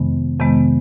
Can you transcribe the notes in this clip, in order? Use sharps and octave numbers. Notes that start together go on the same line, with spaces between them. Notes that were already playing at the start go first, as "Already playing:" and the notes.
Already playing: F2 C3 D#3 G#3 B3
F2 C3 D#3 G#3 B3